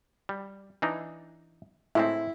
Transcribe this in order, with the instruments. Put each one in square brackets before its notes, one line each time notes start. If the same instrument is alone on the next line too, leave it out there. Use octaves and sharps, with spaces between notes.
[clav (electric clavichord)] G3
E3 D4 D#4
[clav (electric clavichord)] A2 G#3 C4 [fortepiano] E4